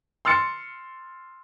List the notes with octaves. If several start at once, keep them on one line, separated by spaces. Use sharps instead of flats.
C6 E6 F6 A6 C#7